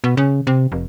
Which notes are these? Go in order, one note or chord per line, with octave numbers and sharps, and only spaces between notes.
B2
C#3
C3
F1